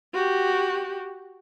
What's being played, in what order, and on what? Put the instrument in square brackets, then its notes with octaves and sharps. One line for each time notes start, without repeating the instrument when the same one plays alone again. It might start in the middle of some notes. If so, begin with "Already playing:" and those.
[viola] F#4 G4